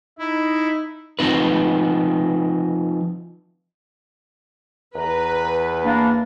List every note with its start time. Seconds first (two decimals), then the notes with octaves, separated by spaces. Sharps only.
0.19 D#4 E4
1.19 F3 C4 D#4 B4
4.95 E2 B4 A#5
5.83 A#3 D4 B5